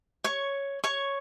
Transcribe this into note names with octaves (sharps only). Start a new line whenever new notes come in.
C#5 C#6
C#5 C#6